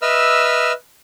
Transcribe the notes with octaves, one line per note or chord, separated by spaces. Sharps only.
B4 D#5 E5 E6 F6